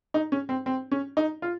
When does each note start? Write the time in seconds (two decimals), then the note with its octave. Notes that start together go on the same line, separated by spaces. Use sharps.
0.14 D#4
0.32 C#4
0.49 C4
0.66 C4
0.92 C#4
1.17 D#4
1.42 F4